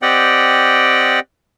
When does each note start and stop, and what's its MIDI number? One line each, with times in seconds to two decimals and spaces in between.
0.02 1.20 60
0.02 1.20 67
0.02 1.20 74
0.02 1.20 75
0.02 1.20 78
0.02 1.20 79